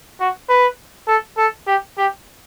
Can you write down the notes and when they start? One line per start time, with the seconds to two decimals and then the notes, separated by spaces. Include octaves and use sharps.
0.20 F#4
0.49 B4
1.08 A4
1.38 A4
1.67 G4
1.98 G4